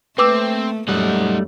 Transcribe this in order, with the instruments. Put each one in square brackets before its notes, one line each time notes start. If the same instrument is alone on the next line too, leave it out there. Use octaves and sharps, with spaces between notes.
[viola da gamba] A3 A#3 [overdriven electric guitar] C4 [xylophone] B4 D6 E6
[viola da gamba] F#2 [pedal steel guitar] G3 A3 [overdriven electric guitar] D#4 F#5